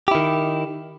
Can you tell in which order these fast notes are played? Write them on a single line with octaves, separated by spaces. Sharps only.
G4 E4 D#3